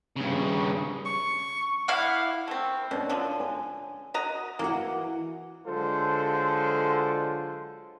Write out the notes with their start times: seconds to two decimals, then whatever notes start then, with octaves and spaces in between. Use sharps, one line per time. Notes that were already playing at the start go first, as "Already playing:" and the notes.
0.16 G2 C#3
1.06 C#6
1.88 E4 F5 F#5
2.48 A3 C4
2.91 B2 C#4 D4
3.09 D3 F3
3.40 G#5
4.14 F#4 D#5 A#5
4.59 E3 A#3 E4 F#4
5.66 D3 F#3 G#3 F4 A4 C5